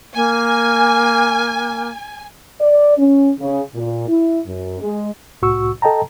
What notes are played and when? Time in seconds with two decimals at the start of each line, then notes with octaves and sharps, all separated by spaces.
0.16 A#3 G#5
2.60 D5
2.98 C#4
3.39 C#3
3.75 A#2
4.08 E4
4.47 F#2
4.81 G#3
5.42 C2 A2 F#4 C#6 E6
5.82 A4 D#5 G5 A5 A#5